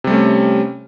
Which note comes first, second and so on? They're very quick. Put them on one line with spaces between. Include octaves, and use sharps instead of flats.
C3 G3 A3 C#4